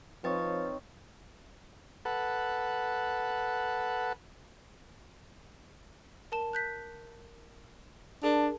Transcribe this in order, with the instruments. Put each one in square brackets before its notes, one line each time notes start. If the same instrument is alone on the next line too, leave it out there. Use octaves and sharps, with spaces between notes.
[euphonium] F3 [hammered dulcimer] C4 D#4 C#5 [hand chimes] B4 A6
[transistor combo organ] A4 B4 F#5
[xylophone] A#4 A5 E7
F#6 G6 B6
[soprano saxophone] D4 [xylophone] G#4 A#4 A5